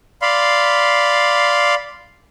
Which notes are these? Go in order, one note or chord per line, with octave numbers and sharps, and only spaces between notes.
D5 F5 B5 C6